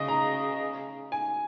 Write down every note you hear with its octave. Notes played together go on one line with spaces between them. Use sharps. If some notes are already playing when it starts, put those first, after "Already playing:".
Already playing: C#3 D#5
A#5
G#5